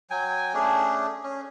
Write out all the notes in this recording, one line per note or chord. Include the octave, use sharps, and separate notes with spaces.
F#3 G5 G#5
A3 C#4 D4 G#4
C#4